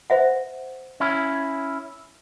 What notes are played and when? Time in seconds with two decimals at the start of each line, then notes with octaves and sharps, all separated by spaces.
0.10 C5 E5 F#5
1.00 C#4 E4